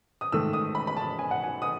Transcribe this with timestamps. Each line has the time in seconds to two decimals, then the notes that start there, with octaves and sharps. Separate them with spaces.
0.21 D#6
0.32 G#2 D#3 A3 E6
0.53 D#6
0.75 B5
0.87 B5
0.97 A5
1.19 G#5
1.31 F#5
1.44 G#5
1.62 D#6